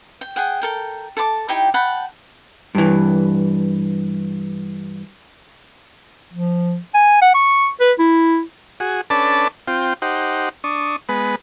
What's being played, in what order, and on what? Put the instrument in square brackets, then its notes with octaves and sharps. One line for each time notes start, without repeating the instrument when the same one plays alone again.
[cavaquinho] G5
G#4 F#5 G5
A4 A#4 G5
A4 A5 B5 D6
D#4 E4 G4 G5
F#5 G5 A5 B5
[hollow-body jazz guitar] G2 E3
[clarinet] F3
G#5
F#5
C#6
B4
E4
[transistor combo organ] F#4 G#4
C#4 D4 A4 B4 D5 A5
C4 F4 G5
D#4 G4 C5 F#5
D4 C#6 D#6
G#3 B3 B4